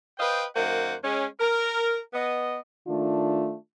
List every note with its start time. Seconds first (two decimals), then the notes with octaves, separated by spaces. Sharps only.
0.18 B4 C5 D#5 F5 G5
0.55 F#2 D#3 A#3 C5 F#5
1.03 G#3 C#4
1.39 A#4
2.13 B3 D#5
2.88 D#3 A3 D4 F4